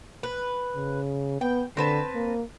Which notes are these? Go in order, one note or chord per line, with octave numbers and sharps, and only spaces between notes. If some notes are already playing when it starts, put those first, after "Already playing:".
B4
C#3
B3 G5
D3 C4 B4 A5
A#3